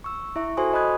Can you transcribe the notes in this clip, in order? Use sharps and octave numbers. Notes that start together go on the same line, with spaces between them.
C#6 E6
E4 E5 C#6
F#4 A4 C5 G#5 C6 D#6
D#5 B5 C#6 D#6 F#6 G#6